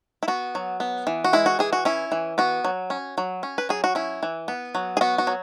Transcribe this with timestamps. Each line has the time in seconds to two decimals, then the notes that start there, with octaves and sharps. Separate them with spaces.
0.23 E4
0.28 B3 F#4
0.55 F#3
0.80 B3
1.07 E3
1.24 F#4
1.33 G#3 E4
1.46 F#4
1.59 E3 G#4
1.73 F#4
1.85 C#4 E4
2.12 E3
2.38 B3 F#4
2.64 F#3
2.90 C#4
3.18 F#3
3.43 C#4
3.58 B4
3.69 F#3 G#4
3.84 F#4
3.95 C#4 E4
4.23 E3
4.48 B3
4.75 F#3
4.97 G#4
5.01 B3 F#4
5.18 F#4
5.27 F#3